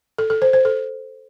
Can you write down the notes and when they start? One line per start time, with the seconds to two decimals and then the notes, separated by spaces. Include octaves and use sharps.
0.18 A4
0.30 A4
0.42 C5
0.53 C5
0.65 A4